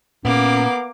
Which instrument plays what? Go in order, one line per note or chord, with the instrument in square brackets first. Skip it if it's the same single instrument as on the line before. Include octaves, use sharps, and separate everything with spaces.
[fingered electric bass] A#2 [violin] A#3 D6 [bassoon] B3 [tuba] C#4